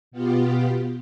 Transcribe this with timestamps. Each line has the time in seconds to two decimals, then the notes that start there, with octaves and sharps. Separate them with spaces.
0.11 B2 B3 F4 G4